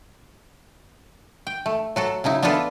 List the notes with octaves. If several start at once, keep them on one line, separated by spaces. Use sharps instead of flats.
G5
A3
F#3 F#4 A4
C#3 F#3 D#4 E4
B3 D4 E4 F4 A4 B4